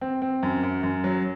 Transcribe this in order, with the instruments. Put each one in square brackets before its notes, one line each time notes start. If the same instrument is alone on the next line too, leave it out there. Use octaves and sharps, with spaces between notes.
[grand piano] C4
C4
F#2
F#2
F#2
F#3